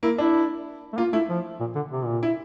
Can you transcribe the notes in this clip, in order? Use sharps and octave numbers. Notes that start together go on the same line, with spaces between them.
A#3 E4
D4 E4
A3
A#3 F4
A3 E4
F3
A#2
D3
C3
A#2
E4